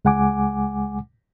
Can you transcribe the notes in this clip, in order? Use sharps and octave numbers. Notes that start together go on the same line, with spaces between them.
C#2 G#3 F#5 G#5 D6